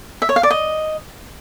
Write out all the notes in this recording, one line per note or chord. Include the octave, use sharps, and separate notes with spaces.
E5
C#5
F5
D5
D#5